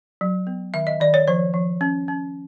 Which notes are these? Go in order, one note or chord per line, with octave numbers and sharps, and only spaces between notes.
F#3
B3
D#3 E5
D#5
D#3 D5
C#5
F3 C5
F3
C#4
C#4